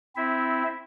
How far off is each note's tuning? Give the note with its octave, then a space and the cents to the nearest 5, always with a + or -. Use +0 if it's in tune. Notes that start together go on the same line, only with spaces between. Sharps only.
C4 -10 E4 +0 E5 -15